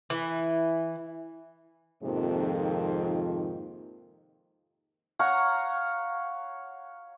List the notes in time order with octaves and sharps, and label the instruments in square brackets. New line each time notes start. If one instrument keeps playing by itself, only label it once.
[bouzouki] E3
[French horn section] F2 G#2 C3 D#3 F3 A#3
[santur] C#5 F5 F#5 A#5